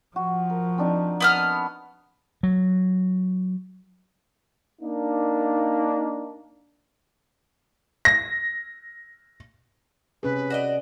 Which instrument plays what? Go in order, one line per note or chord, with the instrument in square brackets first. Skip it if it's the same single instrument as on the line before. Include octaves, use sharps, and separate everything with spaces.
[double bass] F3 [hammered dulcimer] F#4
[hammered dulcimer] A#4
C4 D4 D#4
[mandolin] B3 D#6 F6 [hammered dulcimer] F#5 A5
[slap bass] F#3
[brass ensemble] A#3 D4 D#4
[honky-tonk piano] A#6
[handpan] C3 C#4 G#4 [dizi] B4
[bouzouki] F#4 D5 D#5